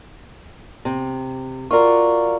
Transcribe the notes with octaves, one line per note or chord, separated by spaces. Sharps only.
C3
F4 F#4 A#4 D5 C#6